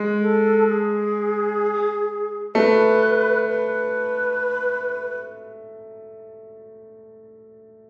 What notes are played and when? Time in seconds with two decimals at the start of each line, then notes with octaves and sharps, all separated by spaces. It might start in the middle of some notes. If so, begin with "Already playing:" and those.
Already playing: G#3
0.22 A4
0.69 G#4
2.55 A3 B4
3.48 B4